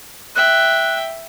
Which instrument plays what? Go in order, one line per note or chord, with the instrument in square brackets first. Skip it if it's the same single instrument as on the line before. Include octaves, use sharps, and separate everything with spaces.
[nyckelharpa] E5 G5 [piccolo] F#6